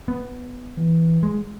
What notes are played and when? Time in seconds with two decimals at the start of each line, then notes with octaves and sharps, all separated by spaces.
0.08 B3
0.77 E3
1.23 G#3